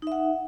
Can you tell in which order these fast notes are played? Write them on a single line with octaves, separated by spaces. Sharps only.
D#4 E5 F#5